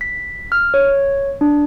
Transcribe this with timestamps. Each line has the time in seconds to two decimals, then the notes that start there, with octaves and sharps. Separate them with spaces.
0.01 B6
0.52 F6
0.74 C#5
1.41 D4